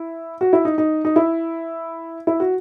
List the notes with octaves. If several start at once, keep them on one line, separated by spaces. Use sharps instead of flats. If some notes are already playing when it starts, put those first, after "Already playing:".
Already playing: E4
F#4
E4
D#4
D#4
D#4
E4
E4
F#4